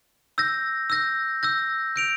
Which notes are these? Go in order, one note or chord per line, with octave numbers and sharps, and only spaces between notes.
E6 G6 A#6
E6 G6 A#6
E6 G6 A#6
G6 D7 F7